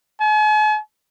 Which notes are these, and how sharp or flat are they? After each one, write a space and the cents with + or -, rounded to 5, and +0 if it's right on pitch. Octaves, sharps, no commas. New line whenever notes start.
G#5 +45